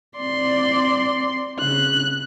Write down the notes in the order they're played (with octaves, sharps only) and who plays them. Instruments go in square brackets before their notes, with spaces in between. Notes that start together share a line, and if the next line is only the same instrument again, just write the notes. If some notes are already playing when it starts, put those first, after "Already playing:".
[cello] C4 D5 [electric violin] C6
[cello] C#3 [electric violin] F#6